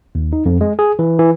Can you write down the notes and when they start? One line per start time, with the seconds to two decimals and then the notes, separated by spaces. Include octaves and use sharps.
0.15 D#2
0.33 D#4
0.46 F2
0.61 G#3
0.79 G#4
0.99 E3
1.19 E3